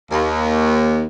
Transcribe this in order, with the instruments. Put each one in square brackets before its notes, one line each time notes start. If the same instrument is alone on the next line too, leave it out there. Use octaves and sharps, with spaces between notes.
[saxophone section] D#2